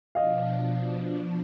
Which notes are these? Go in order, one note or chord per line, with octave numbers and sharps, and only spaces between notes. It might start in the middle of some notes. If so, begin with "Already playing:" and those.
B2 F3 D4 D#5 F5